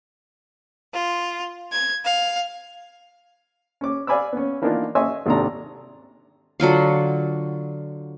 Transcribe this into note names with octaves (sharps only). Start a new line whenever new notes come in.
F4
G#6
F5
C#4 D6
D5 F5 G#5 B5 D6 E6
B3 C#4
E3 A#3 B3 D4 D#4 F4
D#5 E5 G#5 C6 C#6 E6
G#1 D#2 C3 D4 A4 A#5
D3 F#3 F4 F5